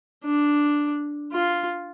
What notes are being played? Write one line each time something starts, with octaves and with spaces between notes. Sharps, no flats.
D4
F4